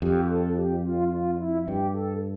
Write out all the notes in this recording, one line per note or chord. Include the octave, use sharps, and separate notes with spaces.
F2 G4
A4
G4
F4
F4
E4
G2 G4
A4